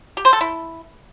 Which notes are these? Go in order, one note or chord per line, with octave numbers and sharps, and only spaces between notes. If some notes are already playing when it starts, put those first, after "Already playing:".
G4
C5
A4
E4